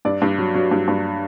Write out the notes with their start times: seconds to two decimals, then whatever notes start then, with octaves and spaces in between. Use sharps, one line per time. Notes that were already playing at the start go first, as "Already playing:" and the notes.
0.05 G2 D5
0.22 G2
0.38 F#3
0.55 F#3
0.71 G2
0.88 G2